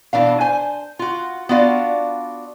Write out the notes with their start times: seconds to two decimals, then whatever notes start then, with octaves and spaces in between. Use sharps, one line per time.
0.13 B2 E3 D4 F5
0.41 C5 G#5
0.99 F4 F#4
1.49 B3 D4 F4 F#4 D5 F5